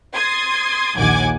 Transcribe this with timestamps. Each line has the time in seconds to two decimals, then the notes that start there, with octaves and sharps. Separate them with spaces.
0.14 C6 D#6 G#6 A6
0.95 A#1 D#2 F#5 G#5 D6 G#6